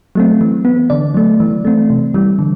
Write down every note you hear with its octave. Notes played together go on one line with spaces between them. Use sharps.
F#3 A3 C4
E3
B3
D3 D5
F#3 A3
E3
A3 C4
C3
E3 G3
D3